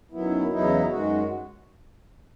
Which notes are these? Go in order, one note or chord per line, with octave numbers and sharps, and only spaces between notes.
F#2 D#3 F#3 B3 E4
E2 C#3 F#3 B3 D#4 E4
F#2 D#3 G#3 F#4